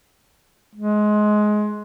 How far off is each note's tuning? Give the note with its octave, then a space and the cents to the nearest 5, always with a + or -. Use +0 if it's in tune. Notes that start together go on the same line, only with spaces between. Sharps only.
G#3 +20